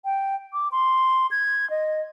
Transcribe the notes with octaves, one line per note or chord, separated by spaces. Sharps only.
G5
D6
C6
G#6
D#5